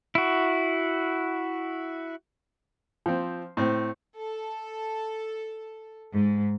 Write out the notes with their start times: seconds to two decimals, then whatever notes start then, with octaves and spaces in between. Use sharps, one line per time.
0.15 E4 F#4
3.06 F3 C4
3.57 A2 C4
4.18 A4
6.12 G#2